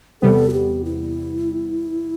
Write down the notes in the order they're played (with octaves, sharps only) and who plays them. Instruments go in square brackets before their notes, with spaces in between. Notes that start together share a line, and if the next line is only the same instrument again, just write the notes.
[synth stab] E2 C3 G3 B3 [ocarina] A4
[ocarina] F#4
G4
E4